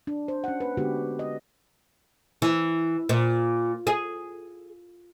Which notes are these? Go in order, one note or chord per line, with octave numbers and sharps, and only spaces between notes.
D4
C5
C#4 F#5
A#3 B4
D3 G#3 B3 D4 F#4 G4
D#5
E3
A#2
G#4